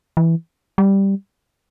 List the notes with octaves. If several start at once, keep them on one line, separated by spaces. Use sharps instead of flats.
E3
G3